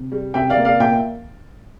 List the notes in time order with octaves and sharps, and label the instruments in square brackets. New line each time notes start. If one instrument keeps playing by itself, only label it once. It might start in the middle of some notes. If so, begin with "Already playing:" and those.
Already playing: [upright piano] C3
G3
C3 E5 G5
D5 F5
A#3
D5 F5
A#2 E5 G5